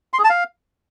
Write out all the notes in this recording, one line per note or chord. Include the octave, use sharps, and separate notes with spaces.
C6
G#4
A5
F5